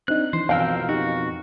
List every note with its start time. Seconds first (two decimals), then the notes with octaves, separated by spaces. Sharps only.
0.08 C4 D4 D#4 F#6
0.33 E3 C5
0.49 F2 B2 C4 A#4 F5 G5 E6
0.89 D#4 F#4 G4